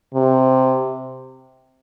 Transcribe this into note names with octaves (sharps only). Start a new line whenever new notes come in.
C3